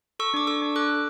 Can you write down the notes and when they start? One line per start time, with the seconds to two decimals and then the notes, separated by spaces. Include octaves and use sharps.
0.19 A4 C#6 E6
0.34 D4 D6
0.47 A4 C#6 E6
0.62 D4
0.76 A4 D6 F#6
0.89 A4